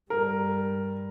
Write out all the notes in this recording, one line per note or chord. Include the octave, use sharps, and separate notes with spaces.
G2 G3 A#4